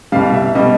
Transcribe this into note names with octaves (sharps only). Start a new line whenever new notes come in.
C2 B2 G3 F5
E5
B2 G3 D#5